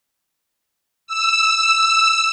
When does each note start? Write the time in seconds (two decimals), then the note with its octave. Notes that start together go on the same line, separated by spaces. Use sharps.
1.07 E6